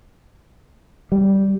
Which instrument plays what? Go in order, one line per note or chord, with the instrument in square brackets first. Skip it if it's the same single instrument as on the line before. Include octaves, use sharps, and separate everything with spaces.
[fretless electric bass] G3